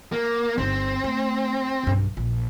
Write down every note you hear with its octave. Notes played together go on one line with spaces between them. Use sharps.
A#3
G1 C4 D#4
A3
B1 G2
A#1